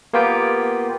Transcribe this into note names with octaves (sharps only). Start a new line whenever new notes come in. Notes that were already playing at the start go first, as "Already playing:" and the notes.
A#3 B3 F4 G4 G5